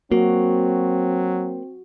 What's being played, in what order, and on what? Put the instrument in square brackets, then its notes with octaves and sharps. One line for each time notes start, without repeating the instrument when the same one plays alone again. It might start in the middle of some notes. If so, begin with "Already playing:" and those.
[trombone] F#3 [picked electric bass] A#3 [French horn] C4 [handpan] F#4